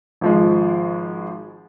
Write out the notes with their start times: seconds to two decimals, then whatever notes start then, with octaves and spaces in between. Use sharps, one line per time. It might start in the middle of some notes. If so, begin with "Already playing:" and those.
0.21 G#1 F3 G#3